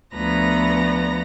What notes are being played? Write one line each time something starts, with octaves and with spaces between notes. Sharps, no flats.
D2 F3 B3 B4 A#5 A#6